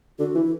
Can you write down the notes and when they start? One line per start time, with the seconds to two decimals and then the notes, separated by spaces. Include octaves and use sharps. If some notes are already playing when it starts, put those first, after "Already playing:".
0.19 D3 F#4
0.35 E3 E4